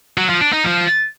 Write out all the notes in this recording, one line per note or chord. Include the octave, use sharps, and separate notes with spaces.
F#3
F3
D4
D#4
F3